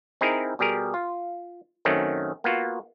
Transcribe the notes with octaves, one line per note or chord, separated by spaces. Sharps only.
C4 D#4 E4 G#4 A#4
B2 G3 G4 G#4 A#4
F4
F#2 D#3 A3 C4 C#4
A#3 B3 F4 F#4